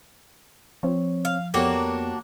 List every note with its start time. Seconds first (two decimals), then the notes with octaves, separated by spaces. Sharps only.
0.83 F3 C4 C#5
1.25 F5
1.54 F2 A#3 B3 D4 F#4 G4 A4 C#5